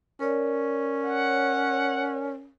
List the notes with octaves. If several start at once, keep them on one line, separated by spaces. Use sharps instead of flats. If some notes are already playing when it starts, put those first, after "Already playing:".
C#4 A#4 C#5 D5
F#5